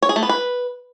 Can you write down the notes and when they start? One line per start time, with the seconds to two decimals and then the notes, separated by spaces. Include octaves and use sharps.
0.02 C#5
0.09 G#4
0.16 A3
0.23 B3
0.29 B4